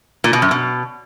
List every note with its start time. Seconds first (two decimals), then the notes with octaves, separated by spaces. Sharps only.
0.24 A#2
0.33 B2
0.42 F#2
0.51 B2